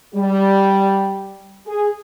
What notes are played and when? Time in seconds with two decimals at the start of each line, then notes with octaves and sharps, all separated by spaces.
0.15 G3
1.66 G#4